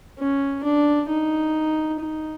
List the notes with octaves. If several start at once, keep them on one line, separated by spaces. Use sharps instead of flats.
C#4
D4
D#4
D#4